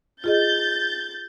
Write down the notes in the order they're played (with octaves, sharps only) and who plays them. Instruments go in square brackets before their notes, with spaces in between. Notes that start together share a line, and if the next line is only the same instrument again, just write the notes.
[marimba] F4 G#4 D#5 [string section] G6 A6